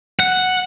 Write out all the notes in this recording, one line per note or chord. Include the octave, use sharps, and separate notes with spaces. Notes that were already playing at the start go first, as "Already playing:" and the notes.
F#5